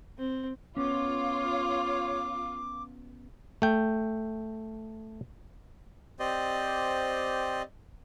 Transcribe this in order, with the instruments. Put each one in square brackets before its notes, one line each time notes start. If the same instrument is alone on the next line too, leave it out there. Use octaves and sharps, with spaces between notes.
[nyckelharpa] C4
[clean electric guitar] B3 C#4 [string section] F4 [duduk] C#5 [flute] D6
[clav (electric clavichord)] A3 G5
[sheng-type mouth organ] C4 G4 C5 D5 D#5